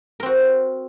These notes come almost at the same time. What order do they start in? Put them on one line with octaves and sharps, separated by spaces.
A#4 C4 F#4